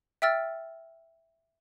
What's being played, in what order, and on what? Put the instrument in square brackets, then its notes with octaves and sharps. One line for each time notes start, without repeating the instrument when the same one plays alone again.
[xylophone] E5 G5 E6 F6 A6